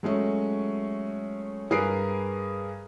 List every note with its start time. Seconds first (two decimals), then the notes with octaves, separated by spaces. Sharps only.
0.03 F#3 G#3 A3 C#4
1.70 G2 G#4 A#4 B4 C7 D7